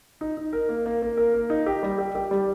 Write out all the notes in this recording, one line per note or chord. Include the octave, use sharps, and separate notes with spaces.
D#4
D#4
A#4
A#3
A#3
A#3
A#4
A#3
D#4
G4
G3
G4
G4
G3